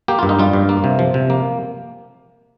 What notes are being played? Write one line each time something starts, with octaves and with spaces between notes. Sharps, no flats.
A#3 G4
G2 F4
D#4
G3 F4
G2
A#3
C3
F3
C3
A#3